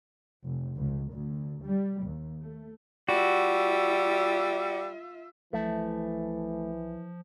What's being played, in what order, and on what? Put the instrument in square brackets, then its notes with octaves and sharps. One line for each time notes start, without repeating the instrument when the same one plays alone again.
[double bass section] F1
C#2
D2
G3
D#2
A3
[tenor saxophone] G3 [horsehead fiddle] F4 E5 [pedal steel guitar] F#4
[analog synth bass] B1 [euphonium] E3 [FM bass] F3 [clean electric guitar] A3